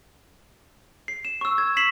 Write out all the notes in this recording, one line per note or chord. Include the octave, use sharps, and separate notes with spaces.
C7
E7
C#6 E6
G#6
B6 C7 E7 F#7